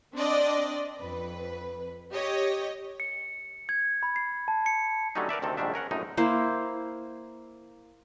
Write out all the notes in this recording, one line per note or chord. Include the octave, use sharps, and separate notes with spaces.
C4 D4 D5 D#5
F2 B4
G4 C#5 D#5
C#7
G#6
B5
C7
A5
C#7
D3 F#3 G3 A3 C#4 D#4
A#4 B4 D5 E5
D2 C3 D#3 C4 A4
A#1 G#2 D#3 G3 D4 E5
C#4 A#4 F#5
A#1 F#2 A2 D#4
A#3 E4 C5